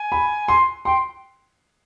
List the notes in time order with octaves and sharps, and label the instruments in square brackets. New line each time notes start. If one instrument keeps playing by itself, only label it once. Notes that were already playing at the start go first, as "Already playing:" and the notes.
Already playing: [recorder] G#5
[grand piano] B5
C6
[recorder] G5 [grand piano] C6